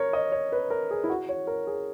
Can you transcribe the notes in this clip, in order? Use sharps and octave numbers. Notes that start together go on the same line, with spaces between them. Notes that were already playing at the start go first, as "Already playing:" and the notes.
Already playing: A#4 C#5
D#5
C#5
B4
A#4
G#4
E4
F#4
C#5
A#4
G#4